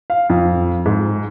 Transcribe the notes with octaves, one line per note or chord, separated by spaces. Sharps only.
F5
F2
G#2